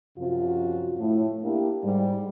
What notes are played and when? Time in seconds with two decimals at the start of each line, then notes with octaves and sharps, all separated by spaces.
0.17 F#2 C3 F3 F4 F#4
0.98 A2
1.43 A#3 D4 E4 G4
1.84 G#2 G3